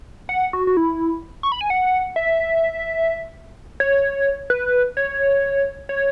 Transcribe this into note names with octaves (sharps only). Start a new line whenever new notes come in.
F#5
F#4
F#4
E4
C#6
B5
G#5
F#5
E5
C#5
B4
C#5
C#5